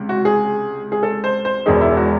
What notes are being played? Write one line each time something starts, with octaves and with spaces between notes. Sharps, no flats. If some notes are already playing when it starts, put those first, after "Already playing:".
Already playing: C#2 C3
F#4
G#4
G#4
A4
C5
C5
E1 E2 D#3 G#3 G#4
E4
F#4